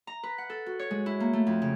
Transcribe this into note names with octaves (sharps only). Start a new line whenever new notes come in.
A#5
B4
F#5
A4
F#4
C#5
G#3
E4
A#3
A3
F2
C#3